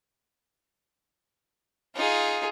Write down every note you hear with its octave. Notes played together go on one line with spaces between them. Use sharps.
D#4 F4 G#4